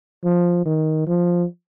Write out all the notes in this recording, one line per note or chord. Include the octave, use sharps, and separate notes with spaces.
F3
D#3
F3